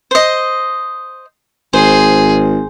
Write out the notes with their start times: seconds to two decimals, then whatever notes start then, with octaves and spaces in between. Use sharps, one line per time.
0.11 C5 D#5
1.73 G#1 G#4 C5